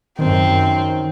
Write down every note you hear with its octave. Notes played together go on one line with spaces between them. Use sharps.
F#2 D#3 C4